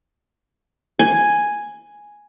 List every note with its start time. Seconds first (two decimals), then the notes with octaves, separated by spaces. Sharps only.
0.99 G#5